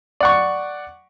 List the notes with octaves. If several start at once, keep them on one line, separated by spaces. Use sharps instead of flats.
D5 F#5 C#6